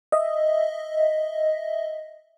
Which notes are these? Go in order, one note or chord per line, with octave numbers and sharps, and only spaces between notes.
D#5 E5